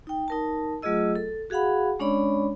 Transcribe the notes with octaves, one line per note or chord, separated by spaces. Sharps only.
D#4 G5
D#4 A#4 A5
F#3 A3 F4 G#4 D#5 E6
A4
F#4 G#4 F5 F#5 B5
G#3 C#4 D4 C#5 D5 B5